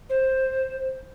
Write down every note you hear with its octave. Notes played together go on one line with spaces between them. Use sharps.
C5